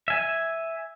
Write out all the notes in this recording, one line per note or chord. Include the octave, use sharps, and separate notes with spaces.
E5 G#5